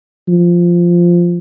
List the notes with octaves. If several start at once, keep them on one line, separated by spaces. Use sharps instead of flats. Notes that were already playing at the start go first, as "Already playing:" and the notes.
F3